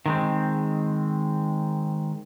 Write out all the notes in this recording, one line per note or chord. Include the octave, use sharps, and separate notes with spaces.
D#3 G#3 C4